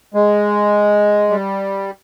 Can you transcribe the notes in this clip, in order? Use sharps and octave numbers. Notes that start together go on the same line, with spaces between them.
G#3
G3